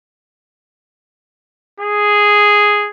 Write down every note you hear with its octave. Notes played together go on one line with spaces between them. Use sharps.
G#4